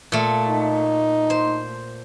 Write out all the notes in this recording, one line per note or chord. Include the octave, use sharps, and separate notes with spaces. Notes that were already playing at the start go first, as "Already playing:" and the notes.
A#2 A3
D#4
C5